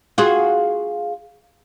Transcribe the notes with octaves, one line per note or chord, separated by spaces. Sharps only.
F4 F#4 G#4